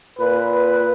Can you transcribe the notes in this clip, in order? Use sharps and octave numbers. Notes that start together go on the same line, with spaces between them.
A#2 B4